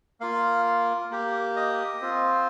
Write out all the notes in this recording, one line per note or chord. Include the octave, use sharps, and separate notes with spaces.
A#3 F4 F5
A#3 G4
D#5
C4 F4